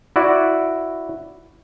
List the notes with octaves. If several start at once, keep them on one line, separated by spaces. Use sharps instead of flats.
E4 F#4 D5